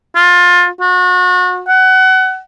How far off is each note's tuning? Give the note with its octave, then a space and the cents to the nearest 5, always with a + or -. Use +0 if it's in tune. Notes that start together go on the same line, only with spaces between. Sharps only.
F4 +25
F#4 -35
F#5 +25